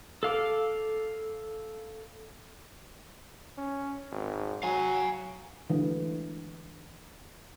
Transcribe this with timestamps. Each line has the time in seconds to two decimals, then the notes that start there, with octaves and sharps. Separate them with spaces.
0.23 A4 F5 D6
3.58 C#4
4.11 G#1
4.63 F#3 F5 G#5
5.70 D3 E3 G#3